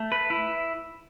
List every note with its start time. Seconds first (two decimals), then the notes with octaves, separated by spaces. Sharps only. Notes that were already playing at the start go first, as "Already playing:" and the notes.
Already playing: A3
0.12 B4
0.30 E4